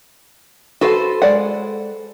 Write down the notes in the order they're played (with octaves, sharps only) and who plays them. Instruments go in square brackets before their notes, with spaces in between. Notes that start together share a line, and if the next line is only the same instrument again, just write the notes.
[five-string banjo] F#4 F#5 [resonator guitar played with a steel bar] A4 B4 C5
[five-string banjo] G#3 D5 F#5